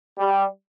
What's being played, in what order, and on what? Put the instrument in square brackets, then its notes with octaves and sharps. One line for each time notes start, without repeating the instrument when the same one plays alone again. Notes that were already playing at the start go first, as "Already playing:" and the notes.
[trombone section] G3